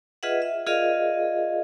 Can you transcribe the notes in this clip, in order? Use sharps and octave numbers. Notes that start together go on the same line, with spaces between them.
F4 G#4 B4 D#5 E5 F#5
E5
F4 G#4 A#4 D5 D#5 F5